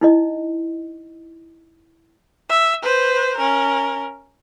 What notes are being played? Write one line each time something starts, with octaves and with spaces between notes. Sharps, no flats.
D#4 E4 D#5
E5
B4 C5
C#4 A#4